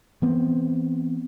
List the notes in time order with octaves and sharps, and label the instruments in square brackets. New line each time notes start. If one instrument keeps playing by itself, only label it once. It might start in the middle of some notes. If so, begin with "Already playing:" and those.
[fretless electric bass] E3 B3 C4